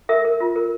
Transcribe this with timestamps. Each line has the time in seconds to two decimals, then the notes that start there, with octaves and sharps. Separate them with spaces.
0.09 A#4 E5
0.25 A#4
0.40 F4
0.56 A#4